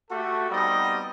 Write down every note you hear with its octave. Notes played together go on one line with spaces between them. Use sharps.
A3 F#4 G4 A4
G3 B3 C4 D#4 D#5